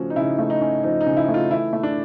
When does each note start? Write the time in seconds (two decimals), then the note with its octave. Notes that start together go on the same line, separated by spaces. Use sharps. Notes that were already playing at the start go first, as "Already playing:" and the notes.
Already playing: C#3 F3 A3 C#4 F#4
0.10 D#4
0.16 C#3 E4
0.39 A3
0.50 D#4
0.61 C#4
0.84 F3 D#4
1.01 D#4
1.06 C#3
1.17 E4
1.29 A3
1.34 F4
1.51 E3 E4
1.73 A3
1.83 D4